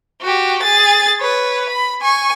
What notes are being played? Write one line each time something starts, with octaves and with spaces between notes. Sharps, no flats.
F#4 G4
G#4 A6
B4 C#5
B5
G#5 C#6